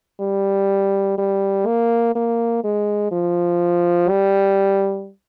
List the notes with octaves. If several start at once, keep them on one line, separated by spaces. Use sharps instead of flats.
G3
G3
A#3
A#3
G#3
F3
G3